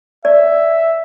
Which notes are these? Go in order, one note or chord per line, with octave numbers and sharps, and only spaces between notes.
D5 E5